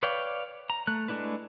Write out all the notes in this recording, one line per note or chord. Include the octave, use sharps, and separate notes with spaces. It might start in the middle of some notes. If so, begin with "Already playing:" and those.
B4 C#5 D5 F5 G5
A#5
A3 F#6
G#3 A3 D4 E4 B4